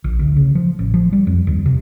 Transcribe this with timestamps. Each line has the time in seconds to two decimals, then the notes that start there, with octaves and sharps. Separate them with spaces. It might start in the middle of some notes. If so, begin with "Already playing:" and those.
0.04 A#1
0.19 D2
0.36 C#3
0.55 F3
0.79 A1
0.94 F3
1.12 G3
1.27 F2
1.47 D#2
1.66 C3